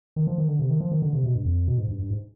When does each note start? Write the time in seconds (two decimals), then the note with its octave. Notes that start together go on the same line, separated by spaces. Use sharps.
0.16 D#3
0.27 F3
0.38 D#3
0.48 D3
0.59 C3
0.70 D#3
0.80 F3
0.92 D#3
1.02 D3
1.13 C3
1.24 B2
1.35 G2
1.45 F2
1.68 B2
1.78 G#2
1.88 G2
1.99 G2
2.11 G#2